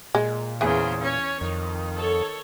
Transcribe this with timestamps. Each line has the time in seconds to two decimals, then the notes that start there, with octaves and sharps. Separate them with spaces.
0.15 A#2 G#3
0.61 E2 C#3 E3 G#4 C5
1.02 C#4 C#5
1.41 F2 D#3
1.95 A4 C#5